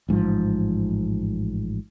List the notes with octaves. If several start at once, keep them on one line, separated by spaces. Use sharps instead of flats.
A1 G#2 B2 F3